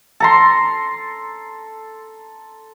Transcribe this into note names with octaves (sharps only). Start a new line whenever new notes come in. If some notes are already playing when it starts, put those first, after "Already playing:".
A4 A#5 C6